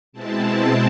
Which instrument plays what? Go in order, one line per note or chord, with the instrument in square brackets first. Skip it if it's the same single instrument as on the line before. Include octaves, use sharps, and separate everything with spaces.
[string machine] B2 G#3 C4 E4 A5